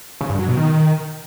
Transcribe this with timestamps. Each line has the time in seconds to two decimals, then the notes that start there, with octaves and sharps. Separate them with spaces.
0.21 C#3
0.30 G2
0.39 F#3
0.48 B2
0.57 D#3